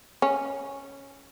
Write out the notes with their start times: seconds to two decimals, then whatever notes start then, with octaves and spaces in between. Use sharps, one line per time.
0.22 C#4